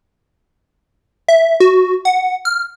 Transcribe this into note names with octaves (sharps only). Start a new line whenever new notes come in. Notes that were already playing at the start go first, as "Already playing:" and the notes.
E5
F#4
F#5
F6